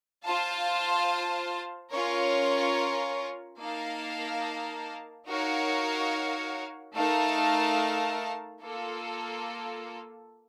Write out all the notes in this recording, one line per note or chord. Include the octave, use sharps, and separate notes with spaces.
F4 C5 F5 A5
C#4 F4 A#4 C#5
A#3 D#4 A#4 F5 A5
D#4 F#4 A#4 C#5 F5
A3 D#4 A#4 F5 A5
A#3 F4 A4